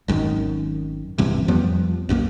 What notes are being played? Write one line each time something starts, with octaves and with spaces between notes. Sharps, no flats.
G#1 F#2 A#2 D#3
G#1 E2 G2 C3
F2 F3 G3 B3
B1 F#2 D#3 A#3